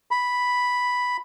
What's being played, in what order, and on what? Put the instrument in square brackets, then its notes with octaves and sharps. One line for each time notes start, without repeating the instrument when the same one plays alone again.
[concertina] B5